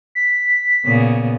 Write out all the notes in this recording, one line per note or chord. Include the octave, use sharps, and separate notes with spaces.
B6
A#2 C#3 B3